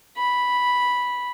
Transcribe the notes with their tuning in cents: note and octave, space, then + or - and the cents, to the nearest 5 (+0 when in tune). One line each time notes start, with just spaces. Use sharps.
B5 -5